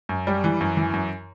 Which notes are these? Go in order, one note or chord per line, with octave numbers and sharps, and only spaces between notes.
F#2
G3
E3
F#2
E3
F#2